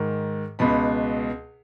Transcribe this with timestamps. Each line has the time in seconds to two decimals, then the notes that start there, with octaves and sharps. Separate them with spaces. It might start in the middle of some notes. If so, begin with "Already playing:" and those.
Already playing: G#2 D#3
0.59 C#2 B2 B5